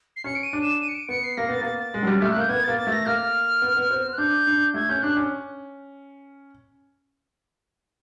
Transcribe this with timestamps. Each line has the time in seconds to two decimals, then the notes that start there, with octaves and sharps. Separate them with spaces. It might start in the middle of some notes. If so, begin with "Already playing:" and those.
0.16 C7
0.24 C#4 C#7
0.35 D7
0.43 D#7
0.53 D4
0.62 E7
0.81 D#7
0.88 C#7
0.95 D7
1.09 B3 C#7
1.24 C7
1.37 A#3 A#6
1.49 B3 A6
1.61 A#3 A6
1.79 A6
1.94 G#3
2.03 F#3
2.07 G3
2.22 A3 F6
2.31 F#6
2.36 A#3 G6
2.49 B3 G#6
2.64 A#3 A6
2.78 A6
2.87 A3
2.92 A#6
3.06 A#3 F6
3.62 B3
3.77 B3
3.91 C4
4.13 F#6
4.18 D4 G6
4.47 D4
4.74 A3 G#6
4.89 C#4 G6
5.02 D4 F#6
5.17 C#4